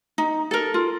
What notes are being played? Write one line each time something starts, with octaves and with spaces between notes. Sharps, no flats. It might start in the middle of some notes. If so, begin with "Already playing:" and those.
D#4
A4 A#4
F4